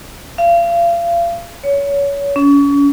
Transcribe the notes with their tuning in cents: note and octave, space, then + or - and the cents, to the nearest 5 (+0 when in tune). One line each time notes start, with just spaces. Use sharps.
F5 -35
C#5 +25
C#4 +35